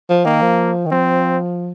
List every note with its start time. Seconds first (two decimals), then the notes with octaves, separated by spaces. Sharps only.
0.09 F3
0.25 D#3 A#3
0.42 F3
0.86 D#3
0.92 F3 C4